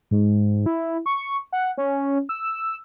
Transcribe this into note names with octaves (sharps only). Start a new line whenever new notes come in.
G#2
E4
C#6
F#5
C#4
E6